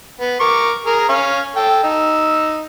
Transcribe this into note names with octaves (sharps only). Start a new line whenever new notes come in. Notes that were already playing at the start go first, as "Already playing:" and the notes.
B3
A#4 C#6 D6
G#4 A#4 A#5
C#4 F5 C#6
A4 G5
D#4 E6